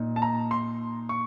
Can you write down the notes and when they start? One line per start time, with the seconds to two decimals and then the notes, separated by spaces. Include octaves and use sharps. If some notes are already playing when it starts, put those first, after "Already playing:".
Already playing: A#2 D#4
0.16 A5
0.22 A#5
0.51 C6
1.09 C#6